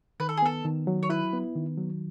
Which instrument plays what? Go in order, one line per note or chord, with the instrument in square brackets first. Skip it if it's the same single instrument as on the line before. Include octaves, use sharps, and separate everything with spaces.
[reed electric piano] D#3 [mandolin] B4
[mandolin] A4
G#4
[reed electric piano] B3 [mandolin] A4
[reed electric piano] D#3
F#3
[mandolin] C#5
[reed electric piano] E4 [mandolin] B4
[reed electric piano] B3
D#3
F#3